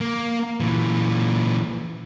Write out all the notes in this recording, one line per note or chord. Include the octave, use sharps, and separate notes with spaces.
A#3
A#2 E3